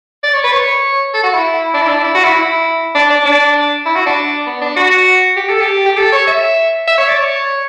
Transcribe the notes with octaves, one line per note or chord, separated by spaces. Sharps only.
D5
C#5
B4
C#5
A4
F#4
E4
D4
E4
D4
E4
F#4
E4
E4
D4
D4
D4
E4
F#4
D4
B3
D4
F#4
G4
A4
G4
G4
A4
C#5
E5
E5
C#5
D5
C#5